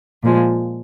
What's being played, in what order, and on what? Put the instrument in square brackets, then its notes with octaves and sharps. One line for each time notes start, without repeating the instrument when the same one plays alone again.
[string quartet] A#2 F3 G#3